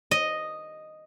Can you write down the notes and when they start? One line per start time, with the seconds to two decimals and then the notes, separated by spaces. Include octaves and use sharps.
0.11 D#5